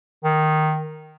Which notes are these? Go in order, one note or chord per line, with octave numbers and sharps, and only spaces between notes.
D#3